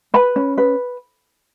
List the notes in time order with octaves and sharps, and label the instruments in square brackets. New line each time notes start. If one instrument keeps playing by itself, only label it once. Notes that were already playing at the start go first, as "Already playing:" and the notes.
[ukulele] B4 B5
C#4
B4